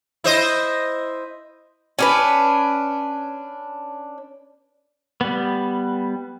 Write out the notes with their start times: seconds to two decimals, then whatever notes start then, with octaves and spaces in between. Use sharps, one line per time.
0.24 E4 C5 D#5
1.99 C#4 D4 B4
5.21 G3 B3